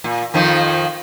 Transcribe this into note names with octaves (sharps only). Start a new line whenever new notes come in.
A#2
F2 D#3 F3